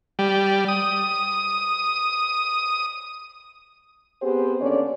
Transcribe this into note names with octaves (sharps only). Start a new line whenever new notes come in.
G3
D#6
B3 C4 G4 G#4 C5
D#2 D3 C#4 C#5 D5